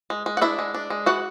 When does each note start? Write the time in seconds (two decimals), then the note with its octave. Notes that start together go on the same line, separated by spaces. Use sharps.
0.10 G#3
0.26 G#3
0.37 F#5
0.41 D4 E4 E5
0.59 G#3
0.74 D4
0.90 G#3
1.06 E3 F#4 F#5